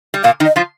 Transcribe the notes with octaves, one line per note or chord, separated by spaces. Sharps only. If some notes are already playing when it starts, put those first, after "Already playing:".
G3
A#2 A#3 F5
D#3 D#4
D#5
F3 F4